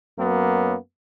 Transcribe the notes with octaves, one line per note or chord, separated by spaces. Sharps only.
F#2 F#3 A#3 B3